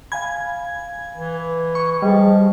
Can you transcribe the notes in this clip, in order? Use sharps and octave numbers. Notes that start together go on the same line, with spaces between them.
F5 G#5 B5 G#6
E3
C#6
F3 G3 G#4 D#5